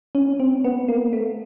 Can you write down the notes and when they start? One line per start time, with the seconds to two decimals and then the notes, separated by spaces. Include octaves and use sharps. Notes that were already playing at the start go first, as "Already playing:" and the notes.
0.15 C#4
0.40 C4
0.64 B3
0.88 A#3
1.13 A3